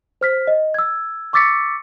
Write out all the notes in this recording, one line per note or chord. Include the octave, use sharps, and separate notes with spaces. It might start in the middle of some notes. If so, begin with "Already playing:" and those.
C5 F6 B6
D#5
E6 G#6
C#6 D6 E6 A6 B6 C#7